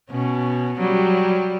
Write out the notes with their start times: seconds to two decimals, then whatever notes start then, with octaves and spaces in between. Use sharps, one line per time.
0.11 B2 C#4
0.79 F#3 G3